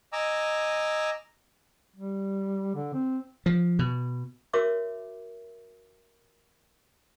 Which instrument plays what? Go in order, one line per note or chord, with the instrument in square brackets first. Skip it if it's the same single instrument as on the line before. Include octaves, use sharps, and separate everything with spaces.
[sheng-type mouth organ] D#5 G#5 A#5 D6 E6
[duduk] G3
D3
C4
[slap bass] F3
B2
[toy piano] F#4 A#4 C#5 E5 D6